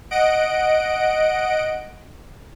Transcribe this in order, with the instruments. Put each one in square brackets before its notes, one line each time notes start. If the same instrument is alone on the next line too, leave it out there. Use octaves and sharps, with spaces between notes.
[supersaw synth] D#5 F#5 D7